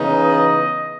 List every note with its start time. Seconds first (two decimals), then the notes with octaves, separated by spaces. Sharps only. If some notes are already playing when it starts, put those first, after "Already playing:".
Already playing: C#3 E3 B3 D#4
0.17 D#5